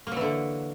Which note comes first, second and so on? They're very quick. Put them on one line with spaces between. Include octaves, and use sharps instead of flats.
A#3 F#3 E3 D3